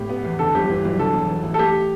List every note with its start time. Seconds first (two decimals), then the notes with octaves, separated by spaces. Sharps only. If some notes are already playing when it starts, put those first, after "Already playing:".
Already playing: A2 G4
0.09 B3
0.25 E2
0.39 D3 A4
0.55 G1 G4
0.70 E3
0.85 B1
0.99 D3 A4
1.13 E1
1.29 E3
1.43 A1
1.54 A4
1.59 A3 G4